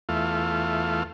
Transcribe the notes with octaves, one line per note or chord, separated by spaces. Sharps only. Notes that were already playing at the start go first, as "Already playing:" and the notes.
E2 A3 F4